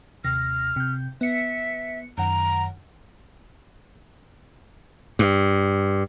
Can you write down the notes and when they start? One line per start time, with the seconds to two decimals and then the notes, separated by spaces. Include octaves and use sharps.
0.24 D#2 C3 F6 A#6
0.76 C3 G6
1.21 B3 E5 C#7
2.18 F#2 D#3 F#5 A#5
5.19 G2